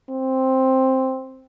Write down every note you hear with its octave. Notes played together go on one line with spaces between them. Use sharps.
C4